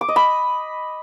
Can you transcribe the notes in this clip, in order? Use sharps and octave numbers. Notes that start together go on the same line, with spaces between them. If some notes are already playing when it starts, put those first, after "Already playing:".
D6
D#5
B5